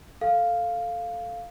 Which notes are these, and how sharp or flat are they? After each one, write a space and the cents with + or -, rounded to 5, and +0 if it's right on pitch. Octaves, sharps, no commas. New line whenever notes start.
A4 +0 F5 +0